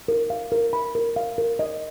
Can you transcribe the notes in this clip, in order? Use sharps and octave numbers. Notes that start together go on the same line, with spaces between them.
A#4
F5
A#4
B5
A#4
F5
A#4
D#5